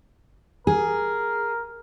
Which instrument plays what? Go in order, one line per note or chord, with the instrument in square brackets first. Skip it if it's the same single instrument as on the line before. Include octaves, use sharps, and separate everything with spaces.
[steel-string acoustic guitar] G#4 [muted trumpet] A#4